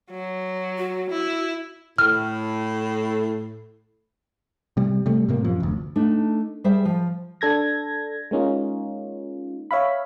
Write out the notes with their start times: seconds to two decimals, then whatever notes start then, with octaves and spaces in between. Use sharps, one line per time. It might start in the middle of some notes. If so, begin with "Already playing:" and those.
0.11 F#3
0.78 F#4
1.10 E4
1.98 A2 F6
4.77 C3 G3
5.06 C3 G3 A3
5.28 A2 C3 A#3
5.44 F#2 F3
5.60 F1 D2
5.96 A3 D4 D#4
6.64 G3 G#4 C5 E5
6.85 F3
7.41 D4 A4 G#6 A#6
8.31 G#3 A#3 C#4 D#4 F4
9.71 C#5 E5 F5 B5